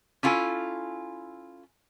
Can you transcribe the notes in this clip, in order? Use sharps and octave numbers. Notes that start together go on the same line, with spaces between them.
C#4 E4 F4 A4 G#5